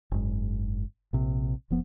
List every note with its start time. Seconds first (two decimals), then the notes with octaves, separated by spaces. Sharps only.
0.11 F#1 G#2
1.13 A#1 C3
1.70 F1 F3 B3